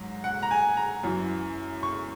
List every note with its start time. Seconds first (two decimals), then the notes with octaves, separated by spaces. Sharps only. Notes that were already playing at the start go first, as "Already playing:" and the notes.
Already playing: G#2 F#3
0.24 F#5
0.43 A#5
0.51 G#5
0.77 A#5
1.03 F#2 E3
1.83 C#6